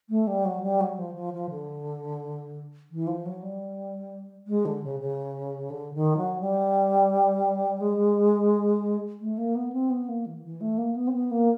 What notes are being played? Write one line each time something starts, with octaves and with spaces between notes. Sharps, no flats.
A3
G3
F#3
G3
F#3
F3
F3
F3
D3
E3
F3
F#3
G3
G#3
D3
C#3
C#3
D3
D#3
F#3
G3
G#3
A3
A#3
B3
C4
B3
A#3
E3
E3
A3
A#3
B3
C4
B3
A#3